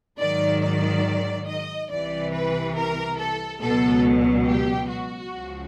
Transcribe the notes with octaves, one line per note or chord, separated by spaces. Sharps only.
G#2 D#3 F#3 D5
D5
D#5
C2 C3 E3 D5
B4
A#4
A4
C#2 B2 F#3 A4
G4
F#4
C#2 C#3 F3